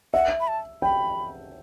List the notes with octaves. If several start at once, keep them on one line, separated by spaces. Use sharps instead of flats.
E5 F#5
B5
A5
G5 B5